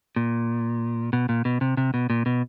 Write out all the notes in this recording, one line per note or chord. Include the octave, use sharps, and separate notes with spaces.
A#2
B2
A#2
B2
C3
C3
B2
A#2
B2